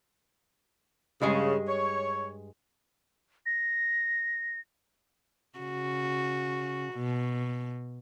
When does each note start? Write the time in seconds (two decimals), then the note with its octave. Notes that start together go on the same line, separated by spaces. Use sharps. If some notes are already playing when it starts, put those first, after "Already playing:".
1.21 G2 C#3 G#3 G#4
1.68 C#5
3.46 A#6
5.58 C#3 F#4
6.93 B2